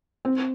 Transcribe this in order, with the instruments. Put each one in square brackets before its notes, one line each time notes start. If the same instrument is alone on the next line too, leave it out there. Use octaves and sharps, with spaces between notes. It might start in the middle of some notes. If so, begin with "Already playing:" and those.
[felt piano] C4